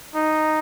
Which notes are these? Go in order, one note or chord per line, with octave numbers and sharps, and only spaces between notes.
D#4